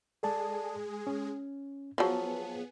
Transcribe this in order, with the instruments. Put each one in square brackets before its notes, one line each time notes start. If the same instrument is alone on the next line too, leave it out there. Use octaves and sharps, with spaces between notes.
[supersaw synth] G#3 G#4 [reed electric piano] A4 D5 A5
[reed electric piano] C#4
[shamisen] F3 F#3 [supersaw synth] B3 G#4 [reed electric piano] A5